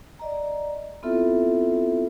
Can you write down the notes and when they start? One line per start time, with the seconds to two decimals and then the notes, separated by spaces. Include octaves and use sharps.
0.19 D5 D#5 A#5
1.03 B3 C4 E4 F4 A4 E5